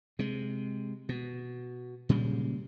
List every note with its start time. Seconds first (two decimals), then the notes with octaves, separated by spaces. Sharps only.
0.19 C3 G#3
1.09 B2
2.09 A#2 C#3 G3 G#3